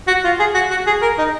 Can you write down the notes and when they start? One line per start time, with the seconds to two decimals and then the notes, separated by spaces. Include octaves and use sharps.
0.07 F#4
0.24 F4
0.39 G#4
0.54 F#4
0.71 F#4
0.87 G#4
1.02 A#4
1.18 D#4